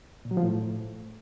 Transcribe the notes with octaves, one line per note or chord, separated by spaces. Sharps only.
A#2
F#3
F3
A2